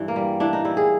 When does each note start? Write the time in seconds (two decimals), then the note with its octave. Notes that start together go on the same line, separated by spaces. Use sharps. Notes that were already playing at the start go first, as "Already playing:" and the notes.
Already playing: G2 E3
0.08 A#3
0.16 G3
0.40 E3 D4
0.53 D#4
0.65 G3 E4
0.77 G#4